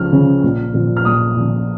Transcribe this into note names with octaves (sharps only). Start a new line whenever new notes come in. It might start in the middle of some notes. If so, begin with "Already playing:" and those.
Already playing: C#2 C#3 F3 F6
C#3 F3
A#1
A#2 F3
F6
A#1 D#6
A#2 F3